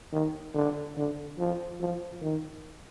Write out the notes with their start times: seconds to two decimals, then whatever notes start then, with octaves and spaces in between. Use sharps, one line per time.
0.12 D#3
0.54 D3
0.96 D3
1.39 F3
1.80 F3
2.22 D#3